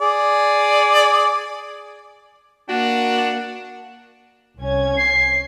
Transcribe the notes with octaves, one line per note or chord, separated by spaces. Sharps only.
G#4 D5
A#3 D4 F#4 F#5
C2 C#4 G#6
C7